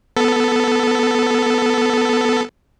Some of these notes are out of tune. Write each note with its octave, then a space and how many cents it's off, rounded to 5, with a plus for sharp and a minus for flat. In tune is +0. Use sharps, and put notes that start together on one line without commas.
B3 +0 A4 +0